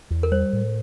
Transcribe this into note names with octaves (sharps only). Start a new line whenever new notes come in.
E2
A#4
G3 C5
A2